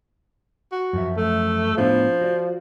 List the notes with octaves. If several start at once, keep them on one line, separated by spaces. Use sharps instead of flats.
F#4
F#2 F3 E5
A3
A2 F3 B3 D4
F#4 D5